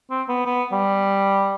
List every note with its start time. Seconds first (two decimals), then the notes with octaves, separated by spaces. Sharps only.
0.10 C4
0.29 B3
0.46 B3
0.72 G3